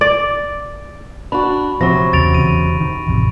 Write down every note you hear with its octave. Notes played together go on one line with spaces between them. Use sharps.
D5
D4 F#4 B5
C3 F3 F#3 C#6 A#6
E2 C#3 A6 D7 F7
E2 C#3 D#7
D#3
A1 F2 C3